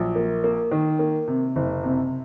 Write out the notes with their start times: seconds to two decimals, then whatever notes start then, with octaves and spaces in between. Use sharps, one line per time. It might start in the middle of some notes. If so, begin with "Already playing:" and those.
Already playing: A#1 F#3
0.15 A#3
0.44 A#3
0.71 D#3
0.99 A#3
1.28 C3
1.56 F#1
1.84 C3